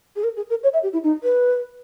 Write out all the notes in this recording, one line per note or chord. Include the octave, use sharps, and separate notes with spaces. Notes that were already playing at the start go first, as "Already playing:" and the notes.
G#4
A#4
G#4
A#4
C#5
E5
G4
E4
D#4
B4